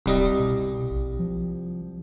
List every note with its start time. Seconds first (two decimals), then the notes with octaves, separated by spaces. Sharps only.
0.06 D1 C2 G3 D#5
0.39 B2
0.91 A#1
1.19 F3